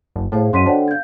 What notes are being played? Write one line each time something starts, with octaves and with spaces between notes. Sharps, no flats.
F#1
A2 G#4 C5 F5
F#2 F#4 D#5 C6 B6 D#7
D3 C5 C#5 F#5 G5
B3 F5 G6 G#6